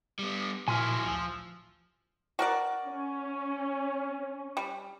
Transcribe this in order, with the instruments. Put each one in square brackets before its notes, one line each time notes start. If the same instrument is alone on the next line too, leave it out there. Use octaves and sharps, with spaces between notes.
[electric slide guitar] G3 B3
[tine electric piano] A#2 [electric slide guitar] F3 F#3 E4 [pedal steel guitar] G#5 C6 F6
[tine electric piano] A1 D2 E6 [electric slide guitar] F3
[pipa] F#4 A#4 D5
[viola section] C#4
[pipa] G3